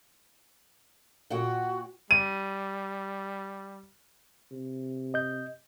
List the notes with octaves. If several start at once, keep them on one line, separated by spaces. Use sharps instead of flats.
A#2 F#4 F#5 G5
G3 D#7
C3
D#5 G6